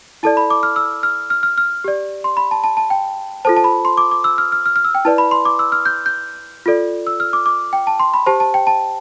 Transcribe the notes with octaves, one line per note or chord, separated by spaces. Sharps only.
E4 A4 D5 A5
B5
D6
F6
E6
F6
F6
F6
F6
G4 D5
C6
B5
A5
A5
A5
G5
F4 A4 C5 A5
A5
B5
C6
D6
D6
E6
F6
F6
F6
F6
E6
G5
E4 B4 D5 A5
B5
C6
D6
E6
F6
G6
G6
F4 A4 D5
E6
F6
D6
D6
G5
A5
C6
B5
G4 C5 A5
A5
G5
A5